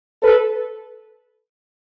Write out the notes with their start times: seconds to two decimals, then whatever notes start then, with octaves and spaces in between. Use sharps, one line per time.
0.22 A4 B4